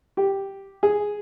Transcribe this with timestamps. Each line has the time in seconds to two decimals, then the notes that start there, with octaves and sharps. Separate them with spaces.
0.17 G4
0.83 G#4